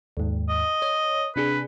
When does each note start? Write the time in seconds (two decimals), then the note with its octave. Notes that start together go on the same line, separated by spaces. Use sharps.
0.17 D#2 G#2
0.49 D#5
0.82 C#5
1.36 C3 D4 G#4 B4